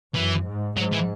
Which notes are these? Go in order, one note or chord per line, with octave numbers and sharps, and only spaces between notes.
F#2 E3
G#2
G#2 F#3
E3